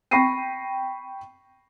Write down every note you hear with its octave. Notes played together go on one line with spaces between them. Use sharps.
G5 B5 C#6 A#6 C7 D#7